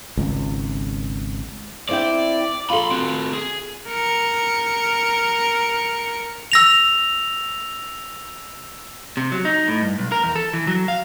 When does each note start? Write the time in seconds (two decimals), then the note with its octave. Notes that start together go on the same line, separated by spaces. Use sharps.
0.17 G#1 C#2
1.89 C4 E4 D5 G5
2.70 F4 A4 B5 C6
2.91 C4 F#4
3.34 G#4
3.89 A#4 C#7
6.52 E6 A#6 F7
9.17 C3
9.32 F#3
9.45 D#4
9.68 A2
9.81 G2
9.98 B1
10.12 A#4
10.24 E2
10.36 A4
10.53 E3
10.67 F#3
10.88 F5